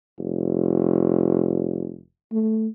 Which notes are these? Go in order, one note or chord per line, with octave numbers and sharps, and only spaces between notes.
F1
A3